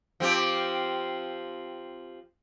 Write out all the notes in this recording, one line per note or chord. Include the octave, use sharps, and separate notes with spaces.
F3 C4 G4